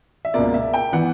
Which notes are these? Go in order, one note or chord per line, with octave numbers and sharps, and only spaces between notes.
E5
C#2 B2 A#3 D5
E5
G5
E3 B3 F#5